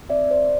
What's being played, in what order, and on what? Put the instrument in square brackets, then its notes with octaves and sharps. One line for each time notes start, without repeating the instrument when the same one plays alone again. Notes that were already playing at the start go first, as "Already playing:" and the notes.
[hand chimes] C4 D5 E5
C5 D5